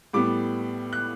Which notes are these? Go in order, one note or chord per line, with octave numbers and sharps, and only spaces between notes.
A2 G3 B3 D6
F#6